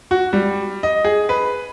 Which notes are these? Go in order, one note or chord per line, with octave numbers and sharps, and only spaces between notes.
F#4
G3
D#5
G#4
B4